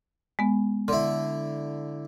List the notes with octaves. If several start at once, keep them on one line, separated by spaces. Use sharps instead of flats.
G#3 B3
D3 E4 C6